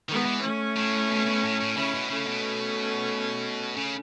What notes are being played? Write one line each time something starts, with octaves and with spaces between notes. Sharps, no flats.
D#3 G#3 B3
E3
A3 C#4
A2
B2
B2
A2
A2
C#3 C#4 E4
B2
C#3 A3 C#4
B2
C#3